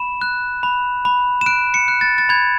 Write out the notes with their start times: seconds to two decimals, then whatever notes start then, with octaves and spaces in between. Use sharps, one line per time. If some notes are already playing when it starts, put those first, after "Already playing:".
Already playing: B5 E7
0.21 F#6
0.63 B5
1.05 B5
1.41 E7
1.46 F#6 D7
1.74 C#7
1.88 F#6
2.01 A6
2.18 A6
2.29 B5 G#6